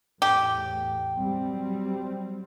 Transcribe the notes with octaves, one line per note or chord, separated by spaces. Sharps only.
E2 A2 G4
F#3 G3 C4